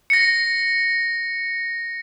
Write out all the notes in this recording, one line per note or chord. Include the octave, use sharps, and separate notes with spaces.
A#6 C#7